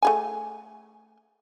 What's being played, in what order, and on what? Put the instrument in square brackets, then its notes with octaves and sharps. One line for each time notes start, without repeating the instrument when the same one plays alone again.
[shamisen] A3 G#4 G#5